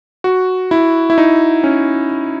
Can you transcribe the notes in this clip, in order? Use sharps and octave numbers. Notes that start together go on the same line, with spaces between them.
F#4
E4
E4
D#4
C#4